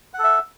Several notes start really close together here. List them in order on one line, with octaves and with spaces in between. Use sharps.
F#5 A4 E5